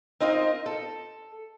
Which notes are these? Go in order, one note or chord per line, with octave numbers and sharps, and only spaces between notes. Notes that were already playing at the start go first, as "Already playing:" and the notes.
C4 D#4 F4 A#4 D#5
A4